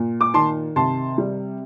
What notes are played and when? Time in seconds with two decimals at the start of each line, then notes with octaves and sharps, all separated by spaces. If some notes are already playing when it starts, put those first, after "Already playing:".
Already playing: A#2
0.21 D6
0.34 D#3 A5 C6
0.76 C3 A5 C6
1.18 G3